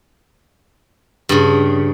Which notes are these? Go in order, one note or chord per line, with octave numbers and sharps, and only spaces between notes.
G2 C#3